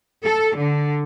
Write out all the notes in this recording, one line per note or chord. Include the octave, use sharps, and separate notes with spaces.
A4
D3